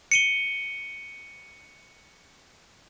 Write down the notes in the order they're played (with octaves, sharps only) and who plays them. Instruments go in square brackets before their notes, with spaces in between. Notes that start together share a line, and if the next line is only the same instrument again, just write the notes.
[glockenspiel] C#7 D#7 G7